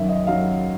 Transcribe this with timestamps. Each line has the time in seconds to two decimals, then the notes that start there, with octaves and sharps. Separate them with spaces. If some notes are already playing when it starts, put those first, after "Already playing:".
Already playing: F#2 D#3 F#3 E5
0.09 D#5
0.27 D#3 F#3 F5